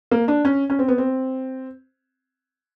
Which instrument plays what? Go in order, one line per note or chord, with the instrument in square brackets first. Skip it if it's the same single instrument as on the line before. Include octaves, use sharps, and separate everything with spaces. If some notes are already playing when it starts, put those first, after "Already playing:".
[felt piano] A#3
D4
C#4
C#4
C4
B3
C4